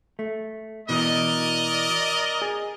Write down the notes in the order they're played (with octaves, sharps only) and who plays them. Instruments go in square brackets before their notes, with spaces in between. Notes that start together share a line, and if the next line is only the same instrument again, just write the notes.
[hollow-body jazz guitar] A3
[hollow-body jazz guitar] B2 E3 [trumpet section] A#4 D5 D#5
[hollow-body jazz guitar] G#4